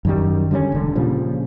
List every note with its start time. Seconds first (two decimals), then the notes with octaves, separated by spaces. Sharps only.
0.05 F#2 D#3 G3
0.51 D3 G3 A#3 C#4
0.72 E1 D3
0.95 A#2 C#3 F3 G3